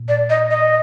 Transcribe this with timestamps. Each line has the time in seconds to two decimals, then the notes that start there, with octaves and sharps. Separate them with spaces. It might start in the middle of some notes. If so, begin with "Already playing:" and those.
Already playing: A#2
0.09 D5
0.30 D#5
0.51 D#5